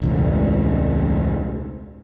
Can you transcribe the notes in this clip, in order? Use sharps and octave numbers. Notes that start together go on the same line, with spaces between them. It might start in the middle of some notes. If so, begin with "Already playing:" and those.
E1 C#2 A2